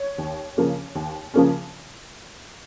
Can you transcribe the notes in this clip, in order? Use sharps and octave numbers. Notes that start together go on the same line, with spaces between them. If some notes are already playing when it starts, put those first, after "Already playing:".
Already playing: C#5
D#2
C#3 F3 A#3 C#4
D#2
C#3 F3 A#3 C#4